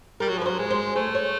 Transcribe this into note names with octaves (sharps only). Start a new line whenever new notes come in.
G3 A#4
F#3
F3 B4
F#3 C5
G#3
C5
A3 C5
C#5